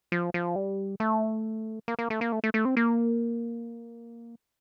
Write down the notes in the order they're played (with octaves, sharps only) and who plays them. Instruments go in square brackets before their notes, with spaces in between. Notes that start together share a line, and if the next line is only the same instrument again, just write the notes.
[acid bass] F3
F3
G3
A3
A#3
A#3
A3
A#3
A3
A3
A3
C4
A#3